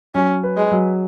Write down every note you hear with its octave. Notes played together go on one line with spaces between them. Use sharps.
F#3 C#4
B4
G#3
F#3